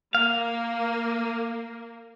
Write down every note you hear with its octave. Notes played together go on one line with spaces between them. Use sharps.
A#3 F5